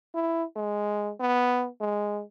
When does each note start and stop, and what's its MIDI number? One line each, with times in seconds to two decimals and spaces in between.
0.15 0.44 64
0.56 1.12 56
1.20 1.68 59
1.81 2.22 56